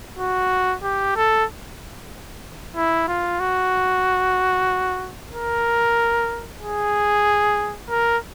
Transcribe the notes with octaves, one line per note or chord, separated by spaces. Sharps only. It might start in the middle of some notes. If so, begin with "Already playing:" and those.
F#4
G4
A4
E4
F4
F#4
A#4
G#4
A#4